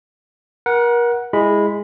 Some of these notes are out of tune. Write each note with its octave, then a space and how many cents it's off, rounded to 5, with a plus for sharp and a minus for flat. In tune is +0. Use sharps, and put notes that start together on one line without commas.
A#4 +35 F#5 +0
G#3 -10 E4 +0 B5 +0